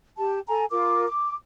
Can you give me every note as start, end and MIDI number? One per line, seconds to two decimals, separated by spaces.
0.18 0.39 67
0.18 0.39 81
0.48 0.65 69
0.48 0.65 80
0.48 0.65 82
0.71 1.06 65
0.71 1.06 70
0.71 1.06 86
1.07 1.35 86